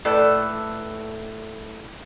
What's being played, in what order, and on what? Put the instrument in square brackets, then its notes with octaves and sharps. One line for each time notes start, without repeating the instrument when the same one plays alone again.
[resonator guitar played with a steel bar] A2 A4 B4 D5